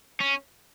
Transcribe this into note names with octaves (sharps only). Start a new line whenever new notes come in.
C#4